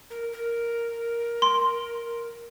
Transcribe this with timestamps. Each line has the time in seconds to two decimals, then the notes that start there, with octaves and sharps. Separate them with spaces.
0.10 A#4
0.32 A#4
1.42 C6